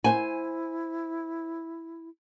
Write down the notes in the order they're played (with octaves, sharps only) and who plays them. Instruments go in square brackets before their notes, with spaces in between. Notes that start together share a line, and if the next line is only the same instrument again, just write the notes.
[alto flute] E4 [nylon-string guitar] C5 G#5